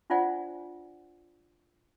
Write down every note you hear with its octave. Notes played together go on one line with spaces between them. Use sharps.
D4 F4 C5 D5 F#5 G#5